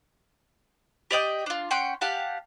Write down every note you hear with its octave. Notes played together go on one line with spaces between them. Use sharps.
G4 D5 D#5 G5
D4 F4
C#4 F#5 G5 C6
G4 F5 F#5 A5